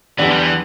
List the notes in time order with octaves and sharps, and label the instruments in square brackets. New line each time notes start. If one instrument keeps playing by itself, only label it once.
[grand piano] E2 D3 B3 D4 G4 [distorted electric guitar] E3
[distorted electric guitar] G3
E3